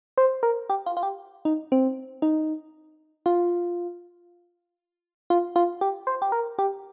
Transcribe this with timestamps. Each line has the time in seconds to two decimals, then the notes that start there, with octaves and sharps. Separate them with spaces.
0.18 C5
0.43 A#4
0.70 G4
0.86 F4
0.97 F4
1.03 G4
1.45 D#4
1.72 C4
2.22 D#4
3.26 F4
5.30 F4
5.56 F4
5.81 G4
6.07 C5
6.22 G4
6.32 A#4
6.59 G4